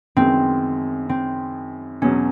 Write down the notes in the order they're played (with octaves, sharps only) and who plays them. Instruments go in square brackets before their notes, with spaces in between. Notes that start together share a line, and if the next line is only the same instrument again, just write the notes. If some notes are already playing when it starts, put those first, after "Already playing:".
[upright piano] F#2 D#3 G#3 B3 [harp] C4
[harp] C4
[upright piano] E2 B2 F#3 [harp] C#4